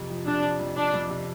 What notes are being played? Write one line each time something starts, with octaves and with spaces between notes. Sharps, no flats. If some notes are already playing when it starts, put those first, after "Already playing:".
Already playing: F2 C3
F3
C3 D4
F3
F2
F2 D4
F2
C3